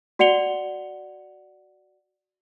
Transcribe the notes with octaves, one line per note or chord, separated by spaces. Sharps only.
F#4 D5 F#5 C#7 F7 G7